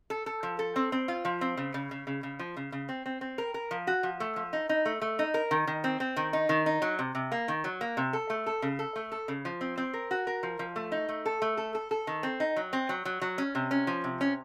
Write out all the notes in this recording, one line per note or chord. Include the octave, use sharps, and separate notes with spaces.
A4
A4
F3
A4
C4
C4
F4
F3
C4
C#3
C#3
C#3
C#3
C#3
F3
C#3
C#3
C4
C4
C4
A#4
A#4
F3
F#4
F3
A3
F3
D#4
D#4
A3
A3
D#4
A#4
D#3
D#3
C4
C4
D#3
D#4
D#3
D#4
F#3
C3
C3
A#3
D#3
F#3
A#3
C3
A4
A3
A4
C#3
A4
A3
A4
C#3
F3
C4
C4
A#4
F#4
A#4
F3
F3
A3
D#4
A3
A4
A3
A4
A4
A4
D#3
C4
D#4
F#3
C4
F#3
F#3
F#3
C#4
C3
C#4
F3
C3
C#4